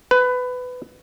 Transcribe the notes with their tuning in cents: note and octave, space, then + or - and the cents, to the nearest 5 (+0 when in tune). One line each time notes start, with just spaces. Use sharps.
B4 +20